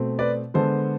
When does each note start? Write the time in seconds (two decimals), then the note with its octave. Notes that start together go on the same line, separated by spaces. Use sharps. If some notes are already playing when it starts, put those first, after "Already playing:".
Already playing: B2 A3 C4
0.19 B4 D5
0.54 D3 G#3 B3 A4 C5